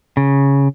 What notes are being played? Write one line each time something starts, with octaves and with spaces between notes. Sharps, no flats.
C#3